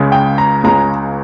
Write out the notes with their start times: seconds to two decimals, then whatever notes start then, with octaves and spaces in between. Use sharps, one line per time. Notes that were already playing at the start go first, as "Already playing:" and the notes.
Already playing: C#2 C#3 G#3
0.12 G5
0.38 A#5
0.64 C#2 C#3 G#3 A#5